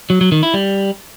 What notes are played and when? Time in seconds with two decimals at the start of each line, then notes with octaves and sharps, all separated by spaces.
0.10 F#3
0.21 F#3
0.32 D#3
0.43 E4
0.54 G3